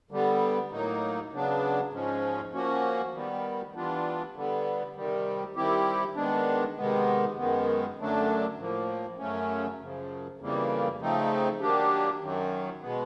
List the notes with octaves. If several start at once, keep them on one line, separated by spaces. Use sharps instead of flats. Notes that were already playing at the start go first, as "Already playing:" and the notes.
D3 G3 B3
A2 F#3 A#3 D#4
C#3 F#3 B3 D4
G#2 F3 G#3 C#4
F3 A#3 C#4 F#4
D#3 G3 B3
E3 G3 B3 D4 F4
D3 G3 B3
C3 D#3 G3
D#3 G3 C4 E4 G4
D#3 G#3 B3 D4
C3 D#3 G#3 B3
F#2 D#3 G#3 B3
F#2 D3 F#3 A3 D4
A2 F3 A#3
F#2 C#3 F#3 A3 C#4
F#2 C#3 F3
F2 C#3 E3 G3 A#3
C#3 F3 A3 C4 D#4
D#3 F#3 A#3 D4 G4
F#2 D#3 F#3
B2 G#3 B3